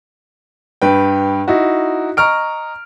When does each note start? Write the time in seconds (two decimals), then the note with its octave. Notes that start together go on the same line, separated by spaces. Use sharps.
0.82 G2 B4 G5
1.48 D#4 E4 F#4
2.17 D#5 A#5 C#6 F6 D7